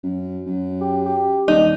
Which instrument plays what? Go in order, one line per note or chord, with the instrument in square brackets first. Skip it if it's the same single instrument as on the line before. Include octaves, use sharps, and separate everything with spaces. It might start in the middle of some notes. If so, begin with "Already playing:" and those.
[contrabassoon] F#2
F#2
[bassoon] G4
G4
[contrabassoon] D#1 [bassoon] D4 [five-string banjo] D#4